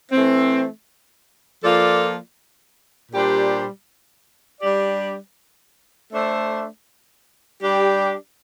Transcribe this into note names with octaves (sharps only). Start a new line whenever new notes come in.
E3 A3 C4
F3 A#3 F4 A4 D5
A#2 G3 D4 G4 C5
G3 D4 G4 D5
A3 D4 A4 C5 E5
G3 D4 G4